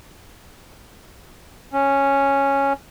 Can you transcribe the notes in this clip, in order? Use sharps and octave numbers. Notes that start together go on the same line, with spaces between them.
C#4